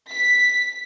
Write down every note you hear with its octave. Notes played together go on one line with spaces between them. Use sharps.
B6